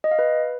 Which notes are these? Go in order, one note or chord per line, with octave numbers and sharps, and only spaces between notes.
D#5
F5
B4